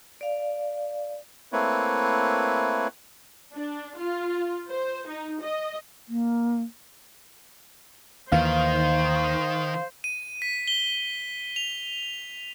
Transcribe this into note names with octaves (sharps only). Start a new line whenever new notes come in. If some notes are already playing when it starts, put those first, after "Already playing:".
D5 F5
A3 A#3 C4 E4 B4 C#5
D4
F4
C5
D#4
D#5
A#3
D#2 D#3 E3 C5 F5
D#7
B6
G7
F7